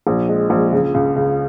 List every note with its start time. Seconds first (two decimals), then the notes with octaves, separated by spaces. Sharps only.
0.07 A#1
0.29 G#3
0.50 A#1
0.72 C#2
0.94 C#2
1.16 C#2